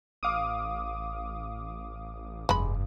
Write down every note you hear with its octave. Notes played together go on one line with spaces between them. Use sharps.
A1 F5 D6 D#6
F1 G2 G#3 B5